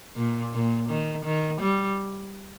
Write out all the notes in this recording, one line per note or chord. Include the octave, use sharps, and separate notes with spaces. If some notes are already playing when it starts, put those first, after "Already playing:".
A#2
A#2
D#3
D#3
G3